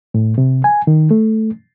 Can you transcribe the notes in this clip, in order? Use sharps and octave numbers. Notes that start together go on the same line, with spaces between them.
A2
C3
G#5
D#3
A3